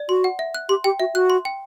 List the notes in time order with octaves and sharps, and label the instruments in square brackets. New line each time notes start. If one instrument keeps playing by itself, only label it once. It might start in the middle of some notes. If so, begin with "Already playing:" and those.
Already playing: [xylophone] D5
[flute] F#4 [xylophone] C6
[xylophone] F#5
E5
F#6
[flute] G4 [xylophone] C6
[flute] G4 [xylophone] G5
[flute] F#4 [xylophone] E5
[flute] F#4 [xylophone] F#6
[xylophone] C6
G5